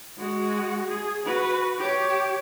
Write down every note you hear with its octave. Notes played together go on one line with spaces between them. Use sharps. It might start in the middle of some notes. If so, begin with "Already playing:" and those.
G#3 F#4
G#4
F#4 B4
G4 C#5